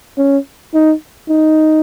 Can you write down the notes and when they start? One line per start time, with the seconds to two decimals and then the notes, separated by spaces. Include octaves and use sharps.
0.18 C#4
0.74 D#4
1.29 D#4